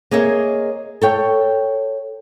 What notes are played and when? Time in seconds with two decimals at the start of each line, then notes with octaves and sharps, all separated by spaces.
0.11 A#3 G#4 C#5 D#5 E5
1.01 A4 C#5 G5